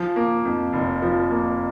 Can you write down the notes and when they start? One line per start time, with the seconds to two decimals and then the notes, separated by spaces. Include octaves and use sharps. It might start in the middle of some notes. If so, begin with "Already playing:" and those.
Already playing: F3
0.16 A#3
0.45 F2
0.73 F1
1.02 F3
1.31 A#3